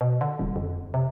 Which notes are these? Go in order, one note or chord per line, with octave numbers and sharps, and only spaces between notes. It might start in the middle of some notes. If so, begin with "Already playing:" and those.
B2
D3
D#1
F2
C3